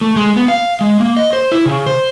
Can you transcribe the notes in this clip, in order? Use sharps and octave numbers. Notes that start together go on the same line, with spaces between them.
A3
G#3
B3
F5
G#3
A#3
D#5
C5
E4
C#3
C5